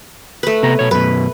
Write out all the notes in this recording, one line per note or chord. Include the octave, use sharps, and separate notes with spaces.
A3 B4
C3 B3 A#5
B2 C#5
F#2 B2 B4